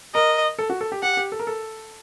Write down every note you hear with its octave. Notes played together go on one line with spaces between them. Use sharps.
A#4 D#5
A4
F#4
A4
G4
G4 F#5
G4
A4
A#4
A4